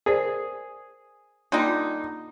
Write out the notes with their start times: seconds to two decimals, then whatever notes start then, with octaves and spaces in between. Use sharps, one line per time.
0.06 G#4 A#4 C5 D5
1.52 D3 G3 A#3 D4 D#4 F4